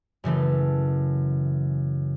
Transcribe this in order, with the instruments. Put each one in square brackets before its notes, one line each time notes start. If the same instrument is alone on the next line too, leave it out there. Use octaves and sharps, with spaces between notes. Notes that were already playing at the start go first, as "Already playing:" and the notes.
[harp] F#2 C#3 E3 A3